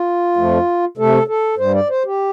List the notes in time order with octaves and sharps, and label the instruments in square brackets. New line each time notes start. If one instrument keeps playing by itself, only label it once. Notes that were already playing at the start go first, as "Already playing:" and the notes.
Already playing: [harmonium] F4
F2 F3 A3
C3 A3 A4
A4
G2 G3 C5
D5
C5
G4